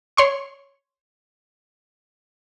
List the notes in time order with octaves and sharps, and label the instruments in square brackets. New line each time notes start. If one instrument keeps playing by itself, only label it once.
[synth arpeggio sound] C#5 C6 C#6